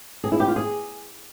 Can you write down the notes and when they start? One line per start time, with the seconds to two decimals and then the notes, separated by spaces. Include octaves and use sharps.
0.24 G#4
0.32 E4
0.40 G4
0.48 F4
0.56 G#4